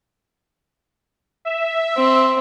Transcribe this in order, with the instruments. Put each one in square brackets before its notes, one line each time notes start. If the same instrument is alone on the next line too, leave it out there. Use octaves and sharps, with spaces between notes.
[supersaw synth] E5
[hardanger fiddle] C4